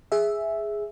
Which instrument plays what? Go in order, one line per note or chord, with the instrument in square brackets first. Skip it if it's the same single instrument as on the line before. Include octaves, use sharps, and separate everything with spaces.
[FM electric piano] G#4 E5